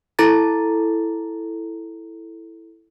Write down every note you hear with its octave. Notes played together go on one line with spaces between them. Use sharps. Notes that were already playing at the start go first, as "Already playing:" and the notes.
E4 A4 A#5 A6